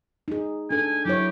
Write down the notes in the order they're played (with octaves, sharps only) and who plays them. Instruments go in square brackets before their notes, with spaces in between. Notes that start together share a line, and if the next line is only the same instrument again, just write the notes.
[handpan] D#4 G#4
[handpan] D4 A4 [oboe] G#5
[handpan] F#3 E4 C#5 [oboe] G4